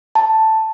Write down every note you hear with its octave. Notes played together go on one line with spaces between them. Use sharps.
A5